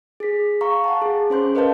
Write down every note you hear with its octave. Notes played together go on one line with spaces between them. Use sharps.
G#4 B6
F5 A#5 C#6
F#5 A5
G#4
C#4 C5 C6 G6
A#4 B4 D#5 F5 A5 G6